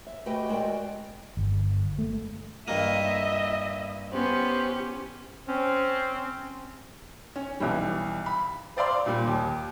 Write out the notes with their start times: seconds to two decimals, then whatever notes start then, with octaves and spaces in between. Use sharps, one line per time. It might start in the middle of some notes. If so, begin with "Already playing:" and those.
0.07 E5
0.26 A3 F#4 G4 B4 D#5 G5
0.49 G#3 F#4 A#4 D5 G5
1.37 G1
1.99 A3
2.68 G2 A#3 D#5 E5
4.12 B3 C#4 G4 C5
5.48 C4 C#4
7.36 C#4
7.60 B1 E3 G3
8.26 B5
8.77 C5 D5 F5 C6
9.06 A#2 G3
9.27 D#2